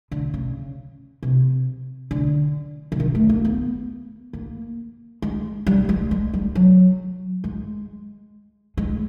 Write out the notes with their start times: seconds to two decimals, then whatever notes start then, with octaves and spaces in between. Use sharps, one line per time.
0.11 D3
0.34 C#3
1.23 C3
2.11 D3
2.92 D3
3.00 D#3
3.15 A3
3.29 A#3
3.45 B3
4.33 A#3
5.22 G#3
5.67 G3
5.89 G#3
6.11 G#3
6.33 G3
6.55 F#3
7.44 G#3
8.77 G#3